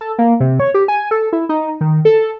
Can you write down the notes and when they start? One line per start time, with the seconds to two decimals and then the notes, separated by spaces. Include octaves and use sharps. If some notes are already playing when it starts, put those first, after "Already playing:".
0.01 A4
0.19 A#3
0.40 C3
0.60 C#5
0.74 G4
0.88 G#5
1.11 A4
1.33 E4
1.49 D#4
1.81 D#3
2.05 A4